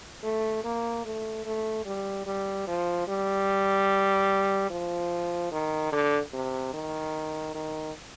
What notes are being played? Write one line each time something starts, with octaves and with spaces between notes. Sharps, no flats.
A3
A#3
A3
A3
G3
G3
F3
G3
F3
D#3
D3
C3
D#3
D#3